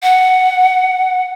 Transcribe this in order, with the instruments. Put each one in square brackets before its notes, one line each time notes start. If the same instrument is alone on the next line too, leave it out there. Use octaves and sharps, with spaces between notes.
[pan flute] F#5